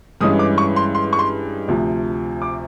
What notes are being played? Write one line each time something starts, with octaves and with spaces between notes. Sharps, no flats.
G2 E3 G#3 C#4 D#6
D6
C#6
C6
C6
C#6
C6
D2 C3 F3
D6